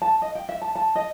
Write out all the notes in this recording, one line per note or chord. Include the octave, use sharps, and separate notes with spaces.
A5
D#5
G5
E5
A5
A5
D#5